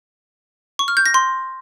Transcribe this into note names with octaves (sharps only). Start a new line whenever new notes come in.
C#6
F6
G6
A#6
C6